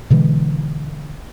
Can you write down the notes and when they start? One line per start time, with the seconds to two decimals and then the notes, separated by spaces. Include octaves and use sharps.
0.10 B2 D3 E3 G#3